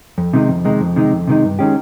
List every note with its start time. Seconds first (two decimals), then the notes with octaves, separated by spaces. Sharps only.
0.18 F2
0.33 C3 D#3 G#3 D#4
0.49 F2
0.65 C3 D#3 G#3 D#4
0.81 F2
0.96 C3 D#3 G#3 D#4
1.12 F2
1.27 C3 D#3 G#3 D#4
1.43 G2
1.59 D#3 G#3 C#4 G4